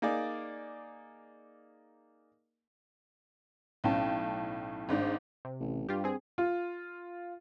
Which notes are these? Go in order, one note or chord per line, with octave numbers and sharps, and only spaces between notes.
A#3 D#4 G#4 D5
B1 A2 C#4 G5 A5
G#1 G#2 D4
C3
A1
G2 F4 G4
C4 G#4
F4